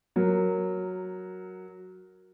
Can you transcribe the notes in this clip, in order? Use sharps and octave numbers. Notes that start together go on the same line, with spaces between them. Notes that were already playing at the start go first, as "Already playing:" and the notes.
F#3 A#4